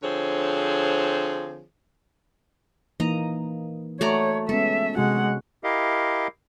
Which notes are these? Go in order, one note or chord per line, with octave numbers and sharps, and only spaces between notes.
D3 F3 C4 G#4 C#5
E3 A#3 D#4 D#5 A#5
A3 F#4 C#5 D5 A#5
G#3 B3 C#4 A4 E5
C3 G#3 F#4 F#5
E4 G4 A#4 D#5 F5